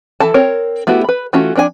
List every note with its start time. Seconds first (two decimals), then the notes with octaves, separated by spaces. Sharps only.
0.20 E3 E4 A4 A5
0.34 C4 A#4 C#5
0.87 A3 B3 E4 F#4 G4
1.04 B4 B5
1.33 E3 A3 C#4 F4 F#4
1.56 F3 C4 D4 G#4 G#5